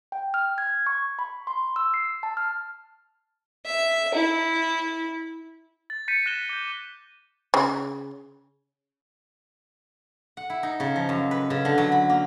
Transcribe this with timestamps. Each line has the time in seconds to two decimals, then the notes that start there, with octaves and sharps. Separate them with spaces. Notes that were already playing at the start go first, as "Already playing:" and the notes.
0.12 G5
0.34 F6
0.58 G#6
0.87 C#6
1.19 B5
1.47 C6
1.76 E6
1.94 C7
2.23 A5
2.37 F6
3.66 E5
4.14 E4
5.90 A6
6.08 G6 A6 B6 C#7 D#7
6.26 F#6 A#6 C#7 E7 G7
6.49 D6 G6
7.54 C#3
10.37 F#5
10.50 E4
10.63 D#4
10.80 C#3
10.96 F3
11.09 F#2
11.31 B4
11.50 C#3
11.65 D3
11.78 F#3
11.92 B5
12.10 A#3